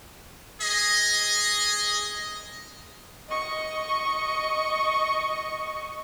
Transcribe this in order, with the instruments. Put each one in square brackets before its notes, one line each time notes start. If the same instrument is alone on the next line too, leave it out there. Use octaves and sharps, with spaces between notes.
[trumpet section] G#4 D#5
[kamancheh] D#5 C#6